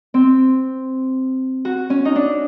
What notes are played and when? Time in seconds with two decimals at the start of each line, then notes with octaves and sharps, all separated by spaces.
0.14 C4
1.65 F#4
1.90 C#4
2.05 D#4
2.16 D4